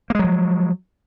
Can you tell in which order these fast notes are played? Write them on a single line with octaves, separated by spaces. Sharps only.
A#3 G#3 F#3 F3